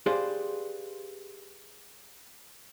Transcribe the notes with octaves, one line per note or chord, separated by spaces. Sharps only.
G4 G#4 B4 C5 D5 F5